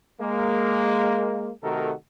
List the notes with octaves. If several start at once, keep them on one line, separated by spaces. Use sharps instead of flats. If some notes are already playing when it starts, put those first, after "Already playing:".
G#3 A#3
C3 D#3 A3 F#4 A4 A#4